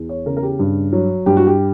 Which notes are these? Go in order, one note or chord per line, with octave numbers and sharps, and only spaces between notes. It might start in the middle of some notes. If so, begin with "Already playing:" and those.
Already playing: E2
C#5
C#3 A#4
A#4
G4
G2
F#3
G2 G4
F#4
G4